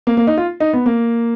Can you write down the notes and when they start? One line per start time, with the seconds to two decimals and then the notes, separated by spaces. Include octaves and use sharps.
0.07 A#3
0.17 A#3
0.27 D#4
0.38 F4
0.60 D#4
0.73 B3
0.86 A#3